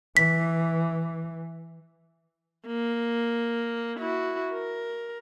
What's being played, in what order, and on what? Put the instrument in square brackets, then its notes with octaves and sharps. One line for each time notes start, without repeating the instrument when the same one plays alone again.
[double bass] E3 [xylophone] B6
[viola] A#3
E4 F#4
A#4